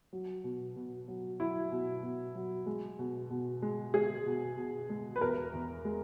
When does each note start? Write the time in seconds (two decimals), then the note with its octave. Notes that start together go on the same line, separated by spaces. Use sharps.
0.13 F#3
0.44 B2
0.76 B2
1.08 F#3
1.40 F#3 E4
1.72 B2
2.03 B2
2.35 F#3
2.66 G#3
2.99 B2
3.31 B2
3.62 G#3
3.94 G#3 G#4
4.26 B2
4.58 B2
4.90 G#3
5.16 B4
5.21 E2 A#4
5.53 E2
5.85 G#3